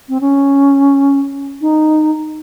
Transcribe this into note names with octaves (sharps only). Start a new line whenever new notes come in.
C4
C#4
D#4